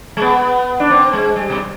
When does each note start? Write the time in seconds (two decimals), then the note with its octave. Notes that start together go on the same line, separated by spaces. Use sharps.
0.17 G#3
0.22 B3
0.80 D4
0.90 C4
1.13 G#3
1.36 G3
1.50 B2